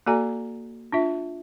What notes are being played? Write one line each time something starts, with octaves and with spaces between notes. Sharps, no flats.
A#3 F#4 A4 D5 G#5 A#5
D4 F4 E5